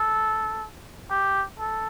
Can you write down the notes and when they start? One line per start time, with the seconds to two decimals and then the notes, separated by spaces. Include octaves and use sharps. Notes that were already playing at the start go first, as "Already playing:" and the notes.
Already playing: A4
1.10 G4
1.59 A4